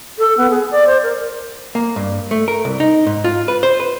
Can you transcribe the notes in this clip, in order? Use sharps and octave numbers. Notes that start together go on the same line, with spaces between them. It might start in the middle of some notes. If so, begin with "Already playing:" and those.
A4
B3
G#4
D5
C5
A#4
A#3
G2
A3
A#4
C2
D#4
G#2
F4
B4
C5
B4